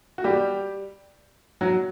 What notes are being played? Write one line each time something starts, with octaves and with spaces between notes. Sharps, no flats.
F#4
G3 G4
F#3 F#4